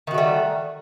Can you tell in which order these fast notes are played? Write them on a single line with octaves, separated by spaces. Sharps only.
D#3 F#4 A3 G3